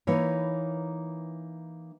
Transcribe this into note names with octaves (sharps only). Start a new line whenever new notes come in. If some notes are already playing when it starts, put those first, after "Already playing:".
E3 A#3 D#4 E4 B4 C#5